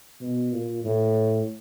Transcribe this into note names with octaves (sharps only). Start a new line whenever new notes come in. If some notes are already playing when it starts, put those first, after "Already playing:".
B2
A#2
A2